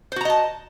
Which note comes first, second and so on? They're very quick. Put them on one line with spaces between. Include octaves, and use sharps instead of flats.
C5 F#4 A#5 D#5 A5